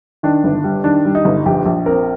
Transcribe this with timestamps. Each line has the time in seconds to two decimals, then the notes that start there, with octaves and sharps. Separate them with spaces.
0.23 D#3 D4
0.44 G1
0.64 G3
0.84 D#3 D4
1.05 G3
1.15 D#4
1.25 G1
1.46 A#1 G4
1.66 A#1
1.86 C4 A#4